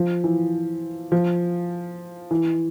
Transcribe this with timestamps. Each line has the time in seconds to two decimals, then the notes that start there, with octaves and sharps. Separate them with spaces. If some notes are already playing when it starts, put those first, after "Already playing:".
Already playing: F3
0.24 E3
1.12 F3
2.31 E3